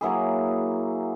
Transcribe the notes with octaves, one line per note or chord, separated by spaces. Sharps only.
F#3 A#3 E4 G#4